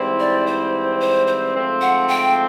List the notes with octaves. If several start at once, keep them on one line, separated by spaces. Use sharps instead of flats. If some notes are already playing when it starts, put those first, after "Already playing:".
Already playing: G#2 E3 G3 C4 E4
D5
C5
C5
C5
G#2 F3 A3 C4
F#5
G5